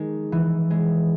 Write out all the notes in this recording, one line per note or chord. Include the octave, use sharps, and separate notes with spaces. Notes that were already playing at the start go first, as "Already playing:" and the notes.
Already playing: D#3 G#3
E3
G#3